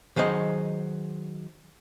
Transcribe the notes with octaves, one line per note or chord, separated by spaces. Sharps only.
D#3 F#3 G#4 C5 D#5